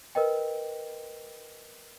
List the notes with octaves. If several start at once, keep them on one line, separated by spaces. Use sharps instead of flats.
A#4 B4 D#5 G5